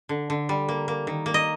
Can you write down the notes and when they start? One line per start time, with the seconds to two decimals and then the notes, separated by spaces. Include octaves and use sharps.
0.09 D3
0.30 D3
0.49 G3
0.69 A#3
0.88 A#3
1.07 D#3
1.26 A#3
1.34 D#5